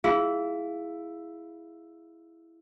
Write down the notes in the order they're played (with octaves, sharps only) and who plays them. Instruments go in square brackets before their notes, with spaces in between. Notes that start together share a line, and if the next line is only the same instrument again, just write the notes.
[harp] E4 [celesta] G#4 F5